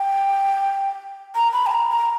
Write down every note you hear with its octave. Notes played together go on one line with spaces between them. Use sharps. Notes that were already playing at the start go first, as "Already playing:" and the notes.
Already playing: G5
A#5
B5
G5
A#5
A#5